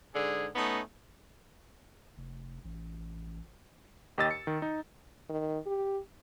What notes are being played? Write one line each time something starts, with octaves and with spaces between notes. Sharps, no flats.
G#2 D3 G#4
A3 B3 C#4 D#4
F1
A1
D#2 G4 D#5 E6 A6
C#7
D#3
D#4
D#3
G4